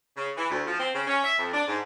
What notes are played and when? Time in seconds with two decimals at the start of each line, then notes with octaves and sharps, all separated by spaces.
0.17 C#3
0.37 E3
0.51 D2
0.67 F3
0.80 C4
0.94 C#3
1.07 C#4
1.24 E5
1.38 F2
1.54 D4
1.68 G#2